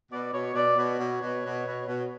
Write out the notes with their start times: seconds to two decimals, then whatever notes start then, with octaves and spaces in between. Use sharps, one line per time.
0.11 B2 D5
0.32 B2 C#5
0.54 B2 D5
0.77 B2 C#5
0.99 B2
1.22 B2
1.43 B2
1.65 B2
1.87 B2